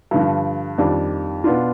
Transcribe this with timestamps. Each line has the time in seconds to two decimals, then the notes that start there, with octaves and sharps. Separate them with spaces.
0.11 G2 D3 F3
0.78 F2 D#3 G3 D4
1.44 B2 B3 D4 F4